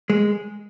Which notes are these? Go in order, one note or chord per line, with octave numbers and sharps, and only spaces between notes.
G#3